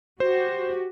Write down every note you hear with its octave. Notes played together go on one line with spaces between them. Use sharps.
F#4 G4 C5